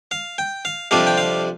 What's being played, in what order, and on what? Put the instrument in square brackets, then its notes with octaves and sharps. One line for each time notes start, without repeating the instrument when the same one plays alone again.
[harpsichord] F5
G5
F5
F2 C3 G3 D4 F4 F5
G5
F5